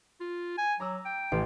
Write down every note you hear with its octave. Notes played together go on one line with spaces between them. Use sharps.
F4
G#5
F#3 A#5 D6 E6
G5
A1 F5